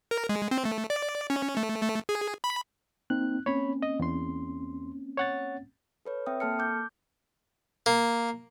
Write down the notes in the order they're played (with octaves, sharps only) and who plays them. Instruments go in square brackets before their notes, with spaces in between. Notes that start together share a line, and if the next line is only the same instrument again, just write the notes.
[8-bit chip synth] A#4
G#3
C4
A3
D5
C#4
A3
A3
G#4
B5
[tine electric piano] A#3 C4 D#4 [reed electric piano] F#6
[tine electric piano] A#3 C4 C#4 [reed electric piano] C#5 B5
[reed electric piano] D#5
E2 C6
C#5 F#5 A6
[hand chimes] A4 B4 C#5
C4 E5 G5 D#6
A#3 A4 A5 F6 C#7
D6 G6
[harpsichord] A#3